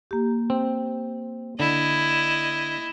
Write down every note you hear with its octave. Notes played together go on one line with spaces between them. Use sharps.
A#3 G4
C4
D3 E4 D#5